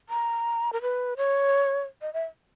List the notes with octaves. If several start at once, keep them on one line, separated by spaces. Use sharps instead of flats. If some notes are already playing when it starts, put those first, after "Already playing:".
A#5
A#4
B4
C#5
D#5
E5